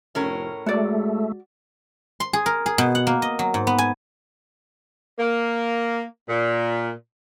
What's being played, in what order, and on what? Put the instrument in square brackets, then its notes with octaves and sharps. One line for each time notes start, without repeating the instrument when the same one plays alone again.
[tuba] F1 [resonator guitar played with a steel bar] A2 C#4 A#4
[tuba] G#3 [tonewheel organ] A3 [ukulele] F#4 D5
[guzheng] C6
G#4
A#4
G#4
B2
F#5
A#3
D#5
F#3
G#2
B3
G#5
[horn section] A#3
A#2